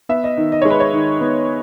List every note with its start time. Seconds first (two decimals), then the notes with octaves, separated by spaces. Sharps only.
0.09 B3 E5
0.24 D#5
0.37 D#3
0.52 D#5
0.62 G#3 C#5
0.70 B4
0.80 C#5
0.93 D#3
1.21 B3